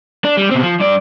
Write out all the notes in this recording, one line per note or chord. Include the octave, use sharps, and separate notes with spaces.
D4
G3
B2 C4
F3
G2 D5